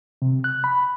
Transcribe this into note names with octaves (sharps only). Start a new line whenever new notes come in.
C3
F#6
B5